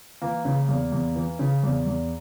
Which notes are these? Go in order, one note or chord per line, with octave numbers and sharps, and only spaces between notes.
E3 A#3
C#3
E2
E2
E3
C#3
E2
E2